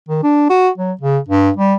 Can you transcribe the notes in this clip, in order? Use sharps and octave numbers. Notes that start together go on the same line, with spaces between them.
D#3
D4
F#4
F#3
C#3
G2
G3